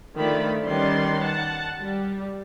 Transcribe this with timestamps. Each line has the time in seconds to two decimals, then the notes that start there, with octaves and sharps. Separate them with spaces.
0.16 D3 D#3 F3 A3 D5 B5
0.66 D#3 G3 C#4 B4 D5 C6
1.23 F#5 A5
1.82 G3